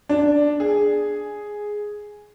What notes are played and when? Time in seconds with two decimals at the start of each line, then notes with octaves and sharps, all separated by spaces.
0.09 D4
0.60 G#4